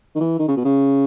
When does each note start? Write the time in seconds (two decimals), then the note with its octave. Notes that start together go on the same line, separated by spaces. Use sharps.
0.15 D#3
0.20 E3
0.39 D#3
0.48 C#3
0.57 B2
0.65 C#3